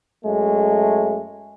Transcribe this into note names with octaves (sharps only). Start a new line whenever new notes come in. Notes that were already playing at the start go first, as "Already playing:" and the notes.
F#2 G#3 A3